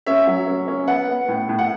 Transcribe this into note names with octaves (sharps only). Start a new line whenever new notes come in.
C#4 E5
F#3
C#4
C#4
B3 F#5
B3
A2
A2
F#5